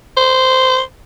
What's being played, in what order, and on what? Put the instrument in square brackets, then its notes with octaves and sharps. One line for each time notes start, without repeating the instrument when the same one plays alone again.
[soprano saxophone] C5